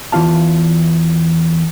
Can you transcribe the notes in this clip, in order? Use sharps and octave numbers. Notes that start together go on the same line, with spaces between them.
E2 E3 E4 F4 F5 A5